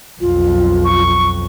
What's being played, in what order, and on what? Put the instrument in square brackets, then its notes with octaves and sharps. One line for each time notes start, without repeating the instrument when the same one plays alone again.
[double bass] B1 F2 [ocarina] F4
[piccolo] C#6